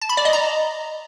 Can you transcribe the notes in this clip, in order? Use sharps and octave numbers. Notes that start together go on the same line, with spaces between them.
A5
B5
D5
D#5
A#5